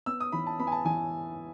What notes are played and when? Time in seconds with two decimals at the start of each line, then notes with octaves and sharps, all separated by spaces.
0.06 B3 E6
0.20 D#6
0.32 E3 B5
0.47 A5
0.59 B3 B5
0.67 G#5
0.72 A5
0.85 E3 G#5